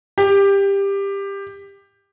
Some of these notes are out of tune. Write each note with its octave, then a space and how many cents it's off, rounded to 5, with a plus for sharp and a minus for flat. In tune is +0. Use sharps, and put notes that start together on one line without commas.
G4 +15